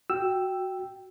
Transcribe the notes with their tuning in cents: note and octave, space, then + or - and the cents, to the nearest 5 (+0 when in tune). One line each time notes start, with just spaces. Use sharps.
F#4 +0 G5 +0 E6 +0